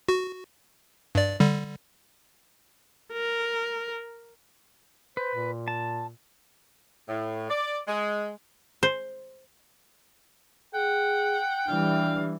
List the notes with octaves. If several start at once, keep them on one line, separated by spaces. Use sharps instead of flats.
F#4
G2 D5
D3 G3
A#4
B4 C5
A#2
A5
A2
D5
G#3
C5
G#4 F#5 G5
E3 G3 D4 F5